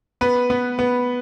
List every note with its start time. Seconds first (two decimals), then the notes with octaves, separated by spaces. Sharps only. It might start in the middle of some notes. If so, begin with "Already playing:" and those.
0.21 B3 B4
0.50 B3
0.79 B3